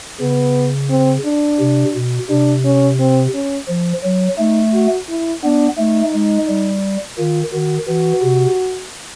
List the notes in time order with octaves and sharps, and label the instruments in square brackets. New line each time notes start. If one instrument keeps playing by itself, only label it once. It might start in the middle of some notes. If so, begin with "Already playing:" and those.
[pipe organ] C#3 [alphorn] B3
[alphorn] C4
D4
[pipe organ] C3
B2
[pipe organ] C3 [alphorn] D4
[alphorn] C#4
C4
C#4
[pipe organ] F3
F#3
[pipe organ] A3 [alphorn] D#4
[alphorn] F#4
E4
[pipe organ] B3 [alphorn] D4
[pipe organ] A3 [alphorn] D#4
[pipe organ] G#3
G3
[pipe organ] D#3 [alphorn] F4
[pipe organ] D#3 [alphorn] F#4
[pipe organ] E3 [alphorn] F#4
[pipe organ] C3